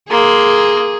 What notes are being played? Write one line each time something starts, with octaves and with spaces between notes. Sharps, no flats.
A#3 G#4 C6